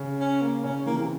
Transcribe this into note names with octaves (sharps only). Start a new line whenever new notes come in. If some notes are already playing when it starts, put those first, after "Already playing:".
Already playing: C#3
C#4
A#3
C#3 C#4
E3 A#3
C3